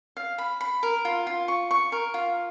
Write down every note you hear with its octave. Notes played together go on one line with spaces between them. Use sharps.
F5
B5
B5
A#4
F4
F4
C#6
C#6
A#4
F4